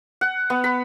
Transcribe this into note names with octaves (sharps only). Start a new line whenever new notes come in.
F#5
B3
B5